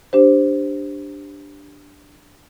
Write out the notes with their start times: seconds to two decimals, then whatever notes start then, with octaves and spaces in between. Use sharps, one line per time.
0.13 D4 G4 C5